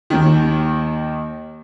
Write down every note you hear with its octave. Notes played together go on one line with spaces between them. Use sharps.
D#2 D#3